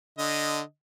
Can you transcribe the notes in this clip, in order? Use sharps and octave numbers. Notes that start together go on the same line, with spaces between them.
D3 D#5